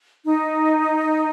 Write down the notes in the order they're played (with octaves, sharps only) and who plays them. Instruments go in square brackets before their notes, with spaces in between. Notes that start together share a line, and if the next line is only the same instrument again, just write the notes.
[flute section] D#4